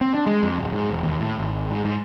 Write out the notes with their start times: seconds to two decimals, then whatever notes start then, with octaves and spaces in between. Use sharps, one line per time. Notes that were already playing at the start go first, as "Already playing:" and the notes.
0.01 C4
0.14 D4
0.27 G#3
0.43 F2
0.58 D1
0.72 G#2
0.91 E1
1.03 D#2
1.20 A2
1.38 G#1
1.71 G#2
1.85 G#2